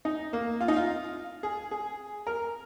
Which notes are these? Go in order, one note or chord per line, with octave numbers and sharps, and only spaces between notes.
D#4
A#3
F4
D#4
F4
G#4
G#4
A#4